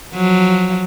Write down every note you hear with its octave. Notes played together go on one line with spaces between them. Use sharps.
F3 F#3